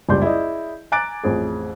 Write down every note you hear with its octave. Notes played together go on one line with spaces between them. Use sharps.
F#1 C#2 G3 D5 C6 G6
E4 G#4 D5 D#5
G#5 A#5 D6 F#6 A6 D7
A1 F2 G#4